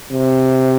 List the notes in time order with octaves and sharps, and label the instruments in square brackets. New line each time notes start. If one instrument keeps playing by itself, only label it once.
[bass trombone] C3